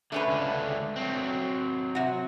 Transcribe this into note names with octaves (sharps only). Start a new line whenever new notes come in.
D3 A3 C#4 B4
C#2 D3
F#3 C4
C3 F#4